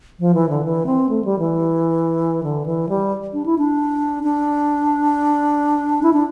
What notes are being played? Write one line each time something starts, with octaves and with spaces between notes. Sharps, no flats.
F3
E3
D3
E3
C4
A3
G3
E3
D3
E3
G3
D4
E4
D4
D4
E4
D4